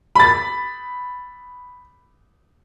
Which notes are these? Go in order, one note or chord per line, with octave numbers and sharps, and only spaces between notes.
B5 A6